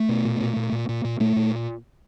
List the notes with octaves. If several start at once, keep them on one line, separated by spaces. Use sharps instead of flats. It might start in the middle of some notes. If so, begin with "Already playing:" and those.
Already playing: A3
B2
A#2
A#2
A#2
A#2
A#2
A#2
A#2 A3
A#2